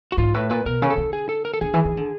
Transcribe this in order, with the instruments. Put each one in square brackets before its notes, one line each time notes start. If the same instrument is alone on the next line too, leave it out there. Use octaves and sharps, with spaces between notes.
[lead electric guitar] F#4
[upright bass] G#2 [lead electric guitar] F4
[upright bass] A2 [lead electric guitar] B4
[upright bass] A#2 [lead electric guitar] B4
[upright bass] B2 [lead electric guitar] A#4
[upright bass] C#3
[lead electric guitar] A4
[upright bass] D3
[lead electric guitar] G#4
A4
A#4
A4
[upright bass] D3 [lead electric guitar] G#4
[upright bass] E3
D#3
D3